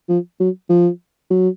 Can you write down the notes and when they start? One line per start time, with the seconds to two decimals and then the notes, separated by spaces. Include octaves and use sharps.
0.09 F3
0.40 F#3
0.70 F3
1.31 F#3